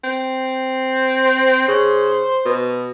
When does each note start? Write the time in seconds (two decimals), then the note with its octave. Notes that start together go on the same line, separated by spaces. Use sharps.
0.04 C4
1.25 C5
1.68 C#3
2.46 B2